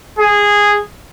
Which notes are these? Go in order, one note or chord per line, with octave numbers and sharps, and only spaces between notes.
G#4